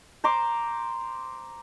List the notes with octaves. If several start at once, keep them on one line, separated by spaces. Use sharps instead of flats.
C5 A#5 C6 D6